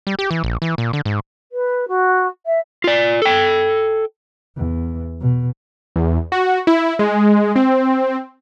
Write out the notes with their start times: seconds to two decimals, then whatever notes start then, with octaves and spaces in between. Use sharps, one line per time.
0.07 G3
0.19 G4
0.31 E3
0.44 A#1
0.62 E3
0.78 A#2
0.93 D3
1.05 G#2
1.52 B4
1.88 F#4
2.46 E5
2.84 F4 D5
3.22 A4 G5
4.57 E2
5.20 B2
5.96 E2
6.32 F#4
6.67 E4
6.99 G#3
7.56 C4